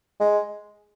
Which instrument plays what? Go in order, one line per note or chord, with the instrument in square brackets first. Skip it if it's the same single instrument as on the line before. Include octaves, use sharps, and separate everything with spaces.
[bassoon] G#3